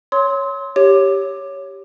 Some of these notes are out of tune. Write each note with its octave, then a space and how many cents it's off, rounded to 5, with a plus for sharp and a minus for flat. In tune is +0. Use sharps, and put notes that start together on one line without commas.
C#5 +0 C6 +0 E6 -45
G4 +0 C#5 +0